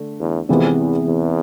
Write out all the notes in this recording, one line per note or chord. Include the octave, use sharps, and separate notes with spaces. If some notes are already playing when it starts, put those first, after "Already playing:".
Already playing: D3 A3
E2
F2 C3 E3 G#3 B3
E2
E2